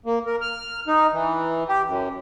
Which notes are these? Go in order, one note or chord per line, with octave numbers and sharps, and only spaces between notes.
A#3
A#4
F6
D#4
E3
G4
F#2